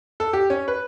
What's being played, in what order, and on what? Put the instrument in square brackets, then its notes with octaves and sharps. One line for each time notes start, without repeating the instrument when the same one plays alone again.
[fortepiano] A4
G4
C#4
B4